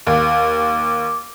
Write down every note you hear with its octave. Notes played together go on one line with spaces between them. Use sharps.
D#2 D6